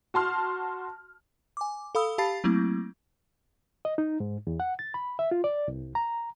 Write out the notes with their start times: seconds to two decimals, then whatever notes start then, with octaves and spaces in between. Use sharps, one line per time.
0.14 F#4 A5 C6 F6
1.57 G#5 D6
1.95 A4 F5 B5 D#6 E6
2.18 G4 F5 A5 B5 A6 C7
2.44 F#3 A3 A#3 C4 E4
3.85 D#5
3.98 D#4
4.20 G#2
4.47 E2
4.60 F#5
4.79 A6
4.94 B5
5.19 E5
5.31 F4
5.44 D5
5.68 C2
5.95 A#5